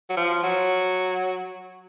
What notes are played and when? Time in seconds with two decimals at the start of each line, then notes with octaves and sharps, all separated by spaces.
0.10 F#3
0.16 F3
0.43 F#3